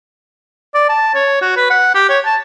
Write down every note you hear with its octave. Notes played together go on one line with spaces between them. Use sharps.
D5
A5
C#5
F#4
B4
F#5
G4
C#5
A5